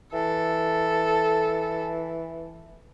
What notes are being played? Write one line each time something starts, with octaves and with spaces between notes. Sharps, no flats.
E3 A4